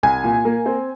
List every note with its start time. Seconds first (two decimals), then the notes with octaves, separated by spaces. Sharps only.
0.03 C2 G#5
0.24 A#2
0.45 A#3
0.66 C4